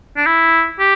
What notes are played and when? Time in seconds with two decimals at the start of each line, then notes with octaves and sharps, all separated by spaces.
0.17 D4
0.26 E4
0.80 G4